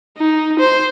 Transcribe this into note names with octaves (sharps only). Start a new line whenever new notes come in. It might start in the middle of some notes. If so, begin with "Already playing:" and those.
D#4
C5